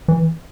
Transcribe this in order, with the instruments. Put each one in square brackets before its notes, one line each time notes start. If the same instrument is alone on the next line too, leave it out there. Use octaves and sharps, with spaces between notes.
[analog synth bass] E3